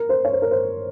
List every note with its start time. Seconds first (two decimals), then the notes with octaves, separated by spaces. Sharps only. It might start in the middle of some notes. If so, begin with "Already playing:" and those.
Already playing: A#4
0.09 C5
0.25 C#5
0.33 C5
0.42 A#4
0.51 C5